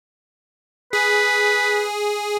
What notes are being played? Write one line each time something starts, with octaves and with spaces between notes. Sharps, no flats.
G#4 B4